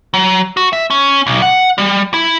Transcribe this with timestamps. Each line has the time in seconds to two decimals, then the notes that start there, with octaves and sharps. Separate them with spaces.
0.14 F#3
0.57 F#4
0.73 E5
0.90 C#4
1.26 B1
1.42 F#5
1.78 G3
2.14 E4